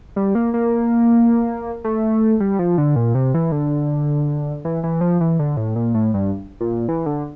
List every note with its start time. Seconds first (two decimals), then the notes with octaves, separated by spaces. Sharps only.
0.16 G3
0.35 A#3
0.54 A#3
1.84 A3
2.40 G3
2.59 F3
2.78 D3
2.96 A#2
3.15 C3
3.34 E3
3.52 D3
4.65 E3
4.83 E3
5.01 F3
5.20 E3
5.39 D3
5.57 A2
5.76 A#2
5.94 A2
6.14 G2
6.61 A#2
6.88 E3
7.06 D3